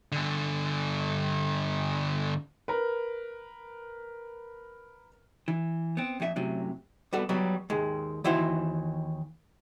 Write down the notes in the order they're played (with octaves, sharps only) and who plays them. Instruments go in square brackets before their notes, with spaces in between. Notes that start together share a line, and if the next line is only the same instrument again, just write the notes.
[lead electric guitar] G2 D3
[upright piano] A#4 B4
[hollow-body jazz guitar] E3
B3 C4
F2 A#2 F4 E5
F#2 A2 C3 F#3
G3 B3 F#4 A4
F#3 G3 B3
D#2 G#3
D#2 E3 E4 F#4 C5